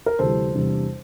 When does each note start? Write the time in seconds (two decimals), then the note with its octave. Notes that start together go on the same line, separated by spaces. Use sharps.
0.06 A#4
0.19 D2 C3 E3 G3 A4 C5
0.54 E2 C3 G3 D4